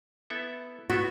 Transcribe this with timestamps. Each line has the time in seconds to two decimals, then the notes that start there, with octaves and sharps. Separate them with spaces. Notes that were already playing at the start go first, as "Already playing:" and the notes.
0.30 B3 E4 A4 E5
0.90 B3 E4 F#4 A4 E5